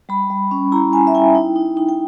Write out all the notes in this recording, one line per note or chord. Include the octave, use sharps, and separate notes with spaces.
G3 B5
G3
C#4
E4 A#5
C#4 G#5
E5
E4 G5
D#4
D#4
D#4
G5